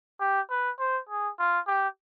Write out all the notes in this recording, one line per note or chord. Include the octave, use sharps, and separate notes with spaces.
G4
B4
C5
G#4
F4
G4